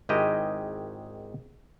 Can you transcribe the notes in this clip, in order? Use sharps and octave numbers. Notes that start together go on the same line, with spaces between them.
G#1 D#3 G#3 E4 G4 D#5